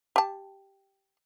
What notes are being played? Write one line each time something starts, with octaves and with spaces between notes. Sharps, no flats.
G4 A5